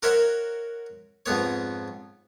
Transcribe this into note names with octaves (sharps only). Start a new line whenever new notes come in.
F#4 A#4 C5 C#5 E5 F#5
F2 G#2 B3 C#5